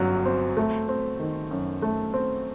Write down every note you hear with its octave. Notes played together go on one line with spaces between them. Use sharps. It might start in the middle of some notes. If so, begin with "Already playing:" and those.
Already playing: G1 F#2 F#3
C4
A3
C4
D#3
F#2
A3
C4